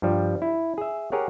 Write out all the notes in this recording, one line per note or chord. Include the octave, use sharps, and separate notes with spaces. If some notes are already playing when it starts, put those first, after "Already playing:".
G2 F3 G3
E4
G#4 E5
G4 G#4 A#4 C#5 F#5